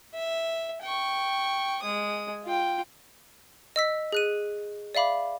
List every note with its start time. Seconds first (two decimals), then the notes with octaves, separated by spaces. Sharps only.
0.14 E5
0.82 G5 C#6
1.82 G#3 D#6
2.45 F4 G5
3.76 D#5 E6 B6
4.12 G#4 F#6 D#7
4.95 D5 E5 F5 B5 D6